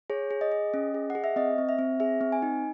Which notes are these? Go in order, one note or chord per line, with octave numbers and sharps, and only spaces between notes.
G#4 C#5
G#4
D#5
G#4
C#4
G#4
F#5
G#4
E5
C4 D#5
C4
E5
C4
G#4 E5
C4
G#5
D#4